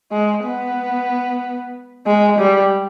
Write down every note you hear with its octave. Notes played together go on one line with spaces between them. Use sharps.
G#3
B3
G#3
G3